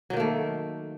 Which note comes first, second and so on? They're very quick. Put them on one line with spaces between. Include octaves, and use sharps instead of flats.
F#3 D#3 A#3 A3